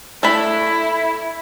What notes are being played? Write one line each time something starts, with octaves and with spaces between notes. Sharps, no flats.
A3 D4 E4 B5